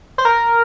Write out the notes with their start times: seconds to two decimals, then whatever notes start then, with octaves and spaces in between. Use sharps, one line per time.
0.18 C5
0.25 A#4